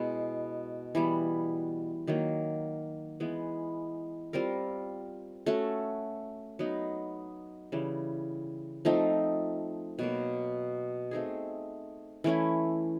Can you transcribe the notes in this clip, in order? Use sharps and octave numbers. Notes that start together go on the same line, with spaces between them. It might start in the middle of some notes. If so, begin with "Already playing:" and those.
Already playing: B2 G#3 B3 E4
E3 G3 B3
D#3 F#3 A#3
E3 G#3 B3
G3 C4 F4 A#4
A3 C#4 F#4 A4
F#3 B3 D#4
C#3 E3 G3
F3 A3 C4 D#4
B2 F#3 A#3
A3 C4 D#4 G#4
E3 A3 C#4 E4